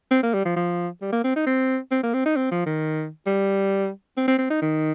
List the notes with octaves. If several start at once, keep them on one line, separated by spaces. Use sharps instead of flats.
C4
A#3
G3
F3
F3
G3
A#3
C4
D#4
C4
C4
A#3
C4
D#4
C4
F3
D#3
G3
C4
C4
C4
D#4
D#3